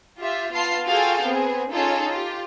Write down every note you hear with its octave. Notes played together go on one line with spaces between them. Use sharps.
F4 G4 E5
B3 F4 F5 A5 C6 C7
F4 F#4 G#4 A4 F5 G5
B3 C4 G#4
C#4 D#4 F4 G#4 A4 C#5
F4 G4